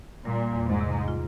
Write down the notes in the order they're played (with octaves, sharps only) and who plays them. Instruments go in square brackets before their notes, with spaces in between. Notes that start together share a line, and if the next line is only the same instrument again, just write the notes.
[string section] A#2 [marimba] G3
[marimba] E2
[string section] G#2
[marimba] C3
F4